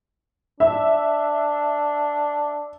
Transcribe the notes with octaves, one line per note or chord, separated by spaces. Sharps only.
D4 E5